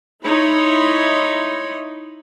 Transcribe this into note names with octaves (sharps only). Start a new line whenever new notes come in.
D#4 E4 C#5 B5 C6